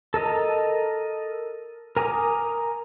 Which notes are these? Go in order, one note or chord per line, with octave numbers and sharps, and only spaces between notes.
A4 A#4 D#5 A#5
A#4 G#5 A#5 D6 D#6